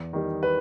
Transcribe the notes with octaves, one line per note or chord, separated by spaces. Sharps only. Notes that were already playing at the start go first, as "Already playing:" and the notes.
Already playing: E2
D#3 G3
B4